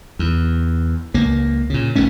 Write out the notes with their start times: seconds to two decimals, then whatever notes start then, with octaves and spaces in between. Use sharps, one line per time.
0.19 E2
1.14 C#2 A#3
1.70 A#2 C#3
1.96 A#1 G#2 A3 C#4